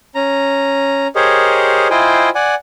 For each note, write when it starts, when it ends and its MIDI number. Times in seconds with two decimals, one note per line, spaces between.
0.15 1.07 61
0.15 1.07 82
1.15 1.88 67
1.15 1.88 68
1.15 1.88 70
1.15 1.88 72
1.15 1.88 73
1.15 1.88 75
1.90 2.29 64
1.90 2.29 65
1.90 2.29 72
1.90 2.29 75
1.90 2.29 79
1.90 2.29 80
2.35 2.55 74
2.35 2.55 78
2.35 2.55 80